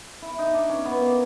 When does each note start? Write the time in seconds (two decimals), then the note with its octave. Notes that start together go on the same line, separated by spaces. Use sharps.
0.22 E4
0.39 D#4
0.54 D4
0.69 C#4
0.85 B3
1.00 A#3